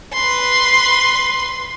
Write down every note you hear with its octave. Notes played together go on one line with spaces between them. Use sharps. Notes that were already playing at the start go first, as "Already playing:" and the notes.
B4 C6